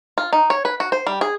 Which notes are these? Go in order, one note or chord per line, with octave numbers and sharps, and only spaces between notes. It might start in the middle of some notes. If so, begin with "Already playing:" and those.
F4
D#4
C#5
B4
F#4
C5
G3
G#4